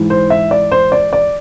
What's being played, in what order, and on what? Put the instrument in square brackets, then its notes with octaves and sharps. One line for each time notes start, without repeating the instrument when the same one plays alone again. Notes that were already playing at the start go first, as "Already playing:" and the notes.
Already playing: [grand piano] G#2 E3
C5
E5
D5
C5
D5
D5